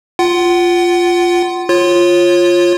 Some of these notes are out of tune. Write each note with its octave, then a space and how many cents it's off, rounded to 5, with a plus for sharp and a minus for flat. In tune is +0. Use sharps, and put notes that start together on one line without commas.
F4 +0 F#5 +30
F4 +0 C#5 -25